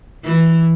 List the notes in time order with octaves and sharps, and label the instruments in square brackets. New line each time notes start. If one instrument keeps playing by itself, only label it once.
[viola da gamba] E3